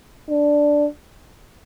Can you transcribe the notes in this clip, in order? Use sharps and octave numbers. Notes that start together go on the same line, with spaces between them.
D4